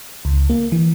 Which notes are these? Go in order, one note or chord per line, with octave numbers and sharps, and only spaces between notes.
C#2
A#3
E3